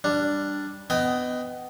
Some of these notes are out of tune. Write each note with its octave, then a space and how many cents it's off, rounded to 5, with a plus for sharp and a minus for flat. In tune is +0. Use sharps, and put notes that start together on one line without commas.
G3 +0 D4 +0
B3 +20 D#5 +0 G5 +0